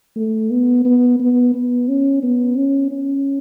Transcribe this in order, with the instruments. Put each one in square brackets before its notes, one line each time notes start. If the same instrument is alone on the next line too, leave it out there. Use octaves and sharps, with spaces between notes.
[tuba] A3
B3
B3
B3
B3
C#4
B3
C#4
C#4